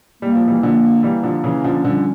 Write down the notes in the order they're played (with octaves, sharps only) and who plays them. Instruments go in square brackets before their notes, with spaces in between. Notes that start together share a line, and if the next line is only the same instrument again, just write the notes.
[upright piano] G3 [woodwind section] A#3
[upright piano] F3
E3 G3
[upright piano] D3 F3 [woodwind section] A#3
[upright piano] E3 G3 [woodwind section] A#3
[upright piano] D3 F3
[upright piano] C#3 E3 [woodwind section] C#4
[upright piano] D3 F3
[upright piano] D3 F3 [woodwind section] G3